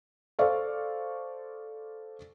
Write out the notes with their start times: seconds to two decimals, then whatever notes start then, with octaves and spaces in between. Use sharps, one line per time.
0.39 A4 C5 D5 F5 C#6